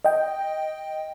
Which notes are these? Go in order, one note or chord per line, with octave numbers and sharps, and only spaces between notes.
D#5 G5